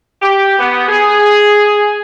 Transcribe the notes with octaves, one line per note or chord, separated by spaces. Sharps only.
G4
B3
G#4